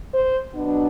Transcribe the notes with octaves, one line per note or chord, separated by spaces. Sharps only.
C5
B2 F#3 B3 D4